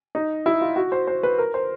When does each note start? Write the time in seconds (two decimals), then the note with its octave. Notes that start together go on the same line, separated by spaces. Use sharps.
0.15 D#4
0.46 E4
0.61 F4
0.76 F#4
0.92 C5
1.07 C5
1.23 B4
1.38 A#4
1.54 C5